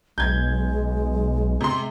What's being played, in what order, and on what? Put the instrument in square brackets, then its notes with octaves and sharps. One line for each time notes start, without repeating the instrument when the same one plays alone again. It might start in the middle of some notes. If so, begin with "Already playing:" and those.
[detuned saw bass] B1 [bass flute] G#3 [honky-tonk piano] G6 G#6
[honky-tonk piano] C3 C6